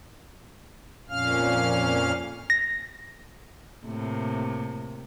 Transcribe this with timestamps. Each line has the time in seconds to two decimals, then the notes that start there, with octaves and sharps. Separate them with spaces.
1.09 F2 A#2 C#4 F5 F6
2.50 A#6
3.86 A2 C3 A#3